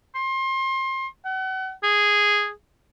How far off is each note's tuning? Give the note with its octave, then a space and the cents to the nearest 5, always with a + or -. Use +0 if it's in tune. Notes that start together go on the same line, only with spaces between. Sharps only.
C6 +30
F#5 +35
G#4 -5